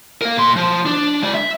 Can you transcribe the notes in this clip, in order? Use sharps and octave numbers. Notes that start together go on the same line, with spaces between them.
A#4 F5
A#2 C6
F3
D4
G#3 D5
E5